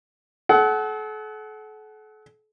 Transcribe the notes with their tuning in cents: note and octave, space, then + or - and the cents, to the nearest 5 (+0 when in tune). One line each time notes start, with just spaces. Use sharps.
A4 -40 F#5 +15